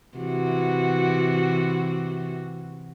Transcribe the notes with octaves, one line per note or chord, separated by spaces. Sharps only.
C3 E3 F#4